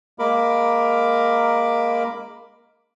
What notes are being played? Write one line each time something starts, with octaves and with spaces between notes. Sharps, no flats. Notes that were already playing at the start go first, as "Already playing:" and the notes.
G#3 A#3 A#4 B5 D6